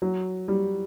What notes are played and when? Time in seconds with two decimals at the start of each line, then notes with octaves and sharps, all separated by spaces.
0.02 F#3
0.48 G3